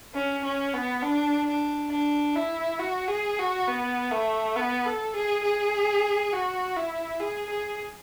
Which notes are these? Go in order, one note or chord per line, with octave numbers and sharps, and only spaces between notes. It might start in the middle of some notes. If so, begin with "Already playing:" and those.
C#4
C#4
B3
D4
D4
D4
E4
F#4
G#4
F#4
B3
A3
B3
A4
G#4
G#4
F#4
E4
G#4
G#4